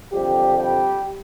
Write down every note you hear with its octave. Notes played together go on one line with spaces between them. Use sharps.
F2 D3 G3 G4
G3 G4